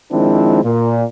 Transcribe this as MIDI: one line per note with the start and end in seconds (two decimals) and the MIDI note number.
0.12 0.62 51
0.12 0.62 53
0.12 0.62 56
0.12 0.62 60
0.12 0.62 62
0.12 0.62 64
0.64 1.04 46